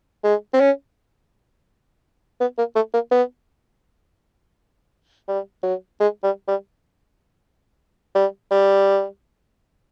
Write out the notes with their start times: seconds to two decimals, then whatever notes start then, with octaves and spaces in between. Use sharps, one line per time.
0.24 G#3
0.54 C4
0.60 C#4
2.41 B3
2.58 A#3
2.75 A3
2.94 A#3
3.11 B3
5.28 G3
5.63 F#3
6.00 G#3
6.23 G3
6.48 G3
8.15 G3
8.51 G3